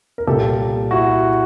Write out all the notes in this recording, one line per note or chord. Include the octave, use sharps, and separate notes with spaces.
A#4
C2 A#2 G4 A4
E4 F#4